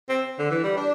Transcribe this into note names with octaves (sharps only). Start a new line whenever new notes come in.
C4
D3
E3
G3
D4